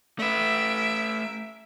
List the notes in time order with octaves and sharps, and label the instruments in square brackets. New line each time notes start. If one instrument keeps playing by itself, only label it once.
[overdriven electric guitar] A3 B4 [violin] E5 D7